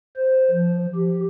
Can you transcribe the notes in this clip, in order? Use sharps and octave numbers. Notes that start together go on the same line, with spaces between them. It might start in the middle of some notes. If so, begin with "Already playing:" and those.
C5
F3
G4